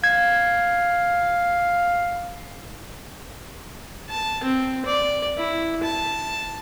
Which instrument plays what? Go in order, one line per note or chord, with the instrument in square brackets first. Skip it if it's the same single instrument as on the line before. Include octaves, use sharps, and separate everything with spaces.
[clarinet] F5 [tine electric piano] G#6
[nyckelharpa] A5
C4
D5
E4
A5